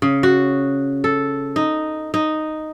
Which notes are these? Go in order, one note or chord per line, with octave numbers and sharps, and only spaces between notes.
C#3
F#4
A4
D#4
D#4